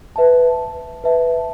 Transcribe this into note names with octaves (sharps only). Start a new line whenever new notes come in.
B4 E5 A5
B4 E5 A5